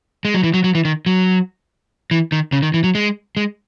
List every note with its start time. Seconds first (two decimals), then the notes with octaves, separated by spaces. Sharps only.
0.25 G#3
0.34 F#3
0.44 E3
0.54 F#3
0.64 F#3
0.75 E3
0.85 D#3
1.06 F#3
2.11 E3
2.32 D#3
2.52 C#3
2.63 D#3
2.74 E3
2.84 F#3
2.95 G#3
3.37 G#3